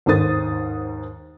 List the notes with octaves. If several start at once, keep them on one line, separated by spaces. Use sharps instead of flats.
D#2 G#2 D#3 C5 D#6 A6